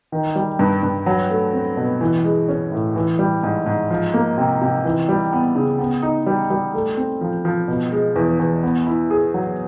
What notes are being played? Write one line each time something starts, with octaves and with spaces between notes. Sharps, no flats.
D#3
G3
G2
G2
F#3
A3
C4
B2
E3
G#3
C#4
A2
E3
G3
G#2
G#2
F3
A#3
C3
C3
E3
G3
B3
C#3
B3
D#4
G3
G3
A3
C4
F3
F3
B2
G#3
E2
E2
B3
E4
G#4
F#3